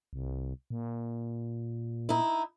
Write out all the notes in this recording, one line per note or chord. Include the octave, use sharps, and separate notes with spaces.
C2
A#2
D#4 E4